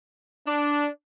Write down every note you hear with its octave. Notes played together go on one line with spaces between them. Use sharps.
D4